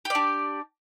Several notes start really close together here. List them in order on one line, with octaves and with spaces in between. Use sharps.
G4 D5 D4